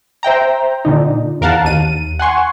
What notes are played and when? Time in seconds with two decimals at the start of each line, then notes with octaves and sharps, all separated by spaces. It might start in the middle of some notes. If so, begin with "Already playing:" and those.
0.23 C5 E5 G5 A#5
0.85 A#2 D3 D#4
1.41 E2 A#4 F5 F#5 A5
1.65 D#2 D#7
2.19 F#5 G#5 C6 C#6